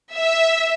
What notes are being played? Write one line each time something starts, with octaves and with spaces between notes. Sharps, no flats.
E5